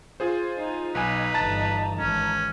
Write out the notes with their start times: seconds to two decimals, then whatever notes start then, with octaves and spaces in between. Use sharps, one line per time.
0.20 F4 G#4 C5
0.58 D#4
0.95 B1 B4 G#5
1.34 G1 E3 A5 A#5 A6
1.99 G#1 E3 C#4